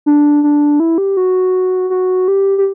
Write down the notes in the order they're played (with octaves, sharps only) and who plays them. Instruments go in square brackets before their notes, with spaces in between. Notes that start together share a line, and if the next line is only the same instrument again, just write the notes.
[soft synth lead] D4
D4
E4
G4
F#4
F#4
G4
G4